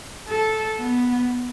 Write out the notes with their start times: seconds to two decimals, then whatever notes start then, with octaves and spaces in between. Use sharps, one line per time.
0.29 A4
0.80 B3